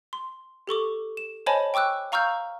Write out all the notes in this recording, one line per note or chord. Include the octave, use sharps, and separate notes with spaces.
C6
G4 A4 C#6 D6
E7
C5 C#5 D#5 G#5 A5 B5
G5 C#6 D6 E6 F#6
F5 A#5 C#6 E6 F6 G6